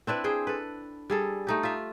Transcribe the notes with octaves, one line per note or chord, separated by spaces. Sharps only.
C4 D4 E4 B4
G#4 C5 G5
A4 B4
G3 G#4 A4
A3 D#4 G4
F4 E5